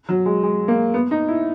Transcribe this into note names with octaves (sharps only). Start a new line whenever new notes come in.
F#3
G#3
G#3
A#3
B3
D#4
E4